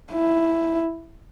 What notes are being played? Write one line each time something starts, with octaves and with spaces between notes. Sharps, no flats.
E4